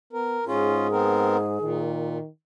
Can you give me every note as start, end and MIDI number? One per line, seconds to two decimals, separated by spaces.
0.13 0.39 59
0.13 0.45 70
0.47 1.61 44
0.47 0.87 61
0.47 0.87 65
0.47 1.78 68
0.92 1.37 59
0.92 1.37 60
0.92 1.37 70
1.61 2.18 46
1.61 2.28 51